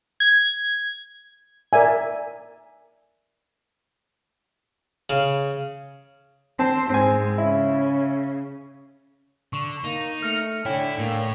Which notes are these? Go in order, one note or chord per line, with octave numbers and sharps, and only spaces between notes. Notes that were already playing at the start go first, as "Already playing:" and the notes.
G#6
A#4 D5 E5 G#5
C#3
C4 C5 A5
G#2 G#3 C4 G#5
C#3 C#4 E4
D3 C#6 E7
A#3 D#4
A3 F6 A#6 C#7
A2 D3 E4 C#5 G5 G#5
A2 A#3